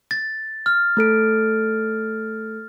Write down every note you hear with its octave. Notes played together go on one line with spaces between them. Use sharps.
A6
F6
A3 A4 D7